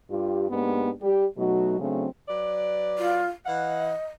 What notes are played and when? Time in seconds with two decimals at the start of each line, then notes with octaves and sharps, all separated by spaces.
0.10 G2 F4 G4
0.50 G#2 A#3 B3 D4 G4
1.02 G3 G4
1.37 B2 F#3 A3 D#4 F#4
1.79 C#3 F#3 A3 C4 D4
2.28 F#3 B4 D5
2.98 F4
3.46 E3 D#5 F5 F#5